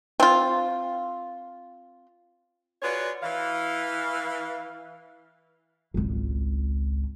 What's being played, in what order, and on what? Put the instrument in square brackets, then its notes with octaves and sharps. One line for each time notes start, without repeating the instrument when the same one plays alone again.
[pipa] C4 F4
[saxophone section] F4 F#4 G#4 B4 C#5 D5
E3 F5
[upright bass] G#1 C#2